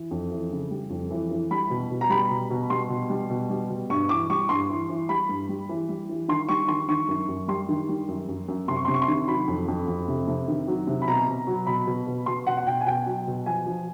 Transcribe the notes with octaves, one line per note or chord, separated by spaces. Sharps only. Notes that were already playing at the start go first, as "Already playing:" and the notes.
Already playing: E3
F2
E3
C#3
G3
F2
E3
E3
G3 B5
B2
B2
A#5
G3 B5
B2
B2
G3 C6
B2
G3
B2
G3
B2
G2 C#6
E3 D6
G3 C#6
G2 C6
E3
E3
G3 B5
G2
G3
E3
G3
E3
D#3 C6
G3 C#6
D#3 C6
D#3 C#6
F#2
F#2
G3 C6
D#3
G3
F#2
F#2
F#2
C3 C6
C#6
C3 C6
C#6
C6
D#3
F#3 B5
F2
F2
F2
C3
C3
D#3
F#3
C3
B5
B2 A#5
B2
F#3
B2 B5
B2
B2
B2 C6
B2 F#5
F#5
B2 G5
G#5
B2 G5
F#3
B2
F3 G#5
F3